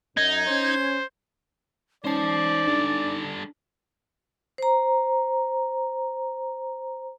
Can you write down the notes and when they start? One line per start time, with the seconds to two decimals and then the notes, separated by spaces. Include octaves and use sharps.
0.17 F#2 D#4 G#6
0.48 C#4 C5
2.04 G#3 C#4 D#4 C5 D5 A5 C7
2.67 G3 D4 A4
4.58 C5 A#5